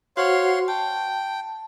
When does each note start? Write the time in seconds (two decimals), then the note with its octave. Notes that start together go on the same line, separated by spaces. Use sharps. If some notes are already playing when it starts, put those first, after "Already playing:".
0.17 F#4 C5 C#5 F5 F#5 C6
0.68 G5 A5